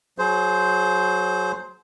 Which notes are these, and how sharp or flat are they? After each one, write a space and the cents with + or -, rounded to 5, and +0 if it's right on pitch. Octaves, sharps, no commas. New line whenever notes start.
F#3 +0 G#4 +35 C5 +0